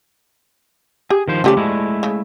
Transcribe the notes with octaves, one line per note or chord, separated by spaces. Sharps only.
G4 G#4
D#3 F3 C5
C#3 F3 A3 C#4 G4 D5
G#3 A3 E4
C#3